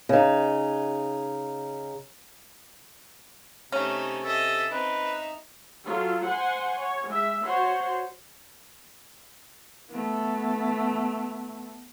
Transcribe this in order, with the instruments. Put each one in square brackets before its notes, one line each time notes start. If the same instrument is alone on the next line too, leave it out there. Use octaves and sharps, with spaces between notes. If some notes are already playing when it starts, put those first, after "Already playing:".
[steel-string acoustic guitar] C#3 D#4
[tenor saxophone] C3 [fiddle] A3 D#4 [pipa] C#4
[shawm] A4 [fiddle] D#5 E5
[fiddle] C4 [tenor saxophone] D#4 [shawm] B4
[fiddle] E5
[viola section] F#3 F4 A4
C5 F#5 G#5 C6
C#5
G#3 E5
F#4 C5 C#5 F#5 C6
[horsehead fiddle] A3 B3